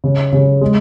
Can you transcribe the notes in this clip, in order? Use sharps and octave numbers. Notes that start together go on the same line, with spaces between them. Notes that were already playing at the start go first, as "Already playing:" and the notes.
C#3
C#3
G#3